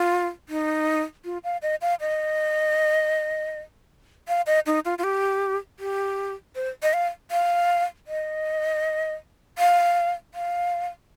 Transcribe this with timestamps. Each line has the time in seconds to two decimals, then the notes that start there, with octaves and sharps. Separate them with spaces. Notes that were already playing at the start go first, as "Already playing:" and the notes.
Already playing: F4
0.49 D#4
1.25 F4
1.44 F5
1.62 D#5
1.81 F5
2.01 D#5
4.28 F5
4.47 D#5
4.66 D#4
4.85 F4
4.98 F4
5.04 G4
5.79 G4
6.56 C5
6.83 D#5
6.93 F5
7.31 F5
8.07 D#5
9.58 F5
10.34 F5